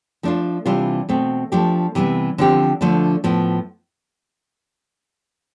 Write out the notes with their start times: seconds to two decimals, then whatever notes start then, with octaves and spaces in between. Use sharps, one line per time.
0.23 F3 A3 D4 F4
0.66 C3 E3 G3 D4 F4
1.09 B2 A3 C4
1.52 F3 A3 D4 G4
1.95 C3 E3 G3 B3
2.38 D3 F3 C4 G4
2.81 D3 F3 A3 D4
3.24 A2 F3 B3